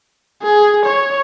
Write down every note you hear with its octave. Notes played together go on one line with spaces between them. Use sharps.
G#4
C#5